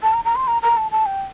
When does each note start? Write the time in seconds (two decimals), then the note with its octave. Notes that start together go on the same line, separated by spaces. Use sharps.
0.03 A5
0.14 A#5
0.25 A#5
0.36 C6
0.48 A#5
0.62 A#5
0.77 A5
0.91 A5
1.06 G5